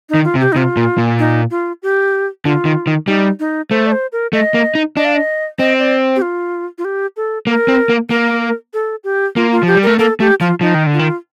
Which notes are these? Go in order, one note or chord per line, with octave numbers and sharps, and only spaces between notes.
D#4
D#3
F4
C3
G4
D#4
C3 F4
A#2
A#2
D#4
F4
G4
D3 F4
D#3
D#3
G3 D#4
D#4
A3 C5
D5
C5
A#4
A3 D#5
A#3
D#4
D4 D#5
F5
D#5
C4 D#5
D5
G4
F4
F4
G4
A4
A#3 A#4
C4
A#3
A#3 A#4
A4
G4
A#3 F4
F4
F3 G4
G3
A3 A#4
A#3 A4
A3 G4
F3 F4
F3 D#4
D#3
D3
F4
D#3